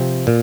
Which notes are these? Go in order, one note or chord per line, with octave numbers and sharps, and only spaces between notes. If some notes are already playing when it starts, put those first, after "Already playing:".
Already playing: C3 F3 C4
A#2